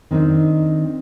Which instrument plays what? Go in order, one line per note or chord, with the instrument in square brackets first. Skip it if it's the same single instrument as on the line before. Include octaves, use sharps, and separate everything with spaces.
[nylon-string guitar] D#3 C4 D4 D#4